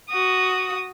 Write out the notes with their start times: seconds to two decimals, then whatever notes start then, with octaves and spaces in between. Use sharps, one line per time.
0.10 F#4 D#6